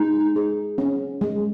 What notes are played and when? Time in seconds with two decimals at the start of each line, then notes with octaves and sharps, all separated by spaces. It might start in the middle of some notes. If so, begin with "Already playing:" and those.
Already playing: G#3 D#4
0.36 G#4
0.78 C#4
1.21 G#3